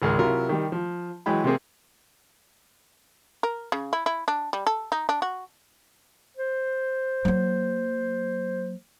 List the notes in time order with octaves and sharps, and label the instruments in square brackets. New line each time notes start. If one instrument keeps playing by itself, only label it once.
[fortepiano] G#1 C#2 G#4 A#4 F6
C3 F#3 E4 F4 A#4
D#3 G3
F3
E3 F#3 G#3 G5 B5
C3 A#3 C4 G#4
[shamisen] A#4
C#3
E4
E4
D4
G3
A4
D#4
D4
F#4
[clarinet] C5
[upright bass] F#3 A#3